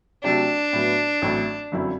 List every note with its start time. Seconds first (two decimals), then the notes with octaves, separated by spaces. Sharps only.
0.23 C3 F#3 A3 D4
0.73 A2 F#3 B3
1.22 A1 A2 F#3 A3 C4
1.72 G1 F#2 F#3 C4 E4